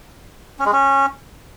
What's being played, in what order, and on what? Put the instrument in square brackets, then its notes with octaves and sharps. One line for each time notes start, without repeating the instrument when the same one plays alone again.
[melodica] C#4
G#3
C#4